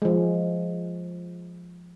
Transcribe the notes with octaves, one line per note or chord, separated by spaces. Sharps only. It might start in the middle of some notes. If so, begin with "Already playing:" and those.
F3 G#3